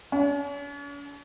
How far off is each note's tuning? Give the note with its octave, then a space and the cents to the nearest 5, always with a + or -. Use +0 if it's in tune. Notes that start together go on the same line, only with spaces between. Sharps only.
C#4 +45